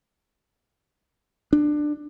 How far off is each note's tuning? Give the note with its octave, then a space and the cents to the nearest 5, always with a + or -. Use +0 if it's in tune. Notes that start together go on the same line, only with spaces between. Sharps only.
D4 +15